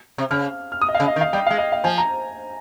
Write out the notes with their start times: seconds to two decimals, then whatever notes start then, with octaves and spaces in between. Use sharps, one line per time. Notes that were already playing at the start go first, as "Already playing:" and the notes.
0.18 C3
0.31 C#3 F6
0.72 F6
0.82 D#6
0.88 D#5
0.95 F5
1.00 C#3
1.08 D#5
1.16 D#3
1.21 F5
1.33 G3 G5
1.47 G#3 F5
1.58 D#5
1.72 F5
1.84 F3 G#5
1.98 A#5